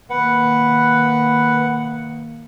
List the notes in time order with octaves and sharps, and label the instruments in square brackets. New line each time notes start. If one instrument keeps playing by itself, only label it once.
[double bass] D#3 A#3 [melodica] B4 [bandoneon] F#5